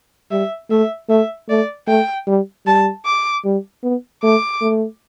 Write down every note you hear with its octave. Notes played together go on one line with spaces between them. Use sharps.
G3 E5
A3 E5
A3 E5
A3 D5
A3 G5
G3
G3 A5
D6
G3
B3
A3 D6
A3